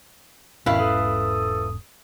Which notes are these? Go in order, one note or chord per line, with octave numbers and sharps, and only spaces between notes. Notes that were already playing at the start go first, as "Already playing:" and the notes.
E1 G#2 B2 D#3 C#4 E4 B4 F5
A4 D#6